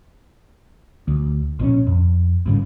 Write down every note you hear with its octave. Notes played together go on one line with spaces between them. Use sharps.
D2
A#1 D#3 C#4
F2
G#1 G2 C#3